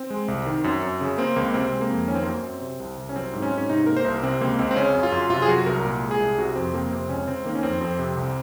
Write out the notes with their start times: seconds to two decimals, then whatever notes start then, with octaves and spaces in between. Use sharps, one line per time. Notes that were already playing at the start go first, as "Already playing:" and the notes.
Already playing: C4
0.10 G#3
0.28 C2
0.46 D#3
0.64 F#2
0.83 F#2
1.01 C#3
1.18 A#3 C4
1.36 C#2 A#3
1.54 C3 C4
1.72 G#3
1.81 A#3
1.90 F2
2.07 D#3 C#4
2.15 C4
2.22 A#3
2.26 F#2 C4
2.43 F#2
2.61 C3
2.80 C2
2.98 C2
3.09 C#4
3.16 F#3 C4
3.33 G#2
3.42 C#4
3.52 G#2
3.58 C#4
3.69 C3 D#4
3.86 A#3 A#4
3.97 C5
4.05 C2 A#4
4.23 C3 C4
4.41 C#2 A#3
4.59 C#2 C4
4.71 C4
4.76 C#3 C#4
4.95 F#2
5.03 F4
5.12 F#2
5.30 C3 F4
5.42 G#4
5.48 F#3 F#4
5.66 C2 A#4
5.84 A#2
6.02 G#3
6.11 G#4
6.20 C2
6.38 C3 F#4
6.55 F2 C4
6.74 F2 A#3
6.91 C3 C4
7.09 C#2 C#4
7.27 C#2 C4
7.45 D#3 A#3
7.55 C#4
7.63 F2 C4
7.81 F2 C4
7.99 C3
8.17 C2